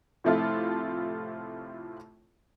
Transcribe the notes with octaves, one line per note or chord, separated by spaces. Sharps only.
A2 C3 F3 A3 E4 F4